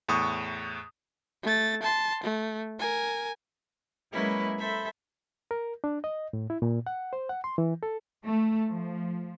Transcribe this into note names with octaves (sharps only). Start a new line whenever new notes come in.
E2 A2 C#6 D#6
A3 A6
A5 C6
A3
A#4 G#5
F#3 G#3 A#3 C#4 E4 B4
A4 C5 E5 B5
A#4
D4
D#5
A2
E4
A#2
F#5
C5
F#5
C6
E3
A4
A3
F3